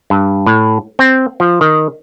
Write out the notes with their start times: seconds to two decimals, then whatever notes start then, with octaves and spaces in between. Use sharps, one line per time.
0.10 G2
0.46 A2
0.99 C4
1.40 F3
1.61 D#3